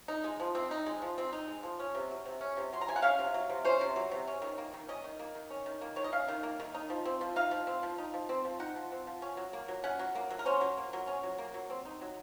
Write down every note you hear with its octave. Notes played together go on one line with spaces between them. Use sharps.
D#4
G#3
F3
C4
D#4
G#3
F3
C4
D#4
G#3
F3
C#4
C3
F#3
C3
C#4
C3
F#3 C6
A#5
C3 G#5
F#5
C#4 F5
C3
F#3
C3
C#4 C5
C3
F#3
C3
C#4
D#3
A#3
D#3
C#4 D#5
D#3
A#3
D#3
C#4
D#3
A#3
D#3 C#5
D#5
C#4 F5
D#3
A#3
D#3
D#4
F3
C4
F3
D#4 F5
F3
C4
F3
D#4
F3
C4
F3
D#4 F#5
F3
C4
F3
C#4
F#3
A#3
F#3
C#4 F#5
F#3
A#3
F#3
A#4
C#4 C5
F#3
A#3
F#3
C#4
F#3
A#3
F#3
C4
D#4
F#3